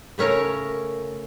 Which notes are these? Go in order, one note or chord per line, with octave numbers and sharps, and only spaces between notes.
C#3 A3 C#4 A#4 C#5